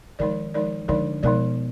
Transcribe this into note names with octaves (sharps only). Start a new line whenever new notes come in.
D#3 F3 G#3 D#4 A#4 D5
F3 G#3 D#4 A#4 D5
D3 F3 G#3 D#4 A#4 D5
B2 F3 G#3 D#4 A#4 D5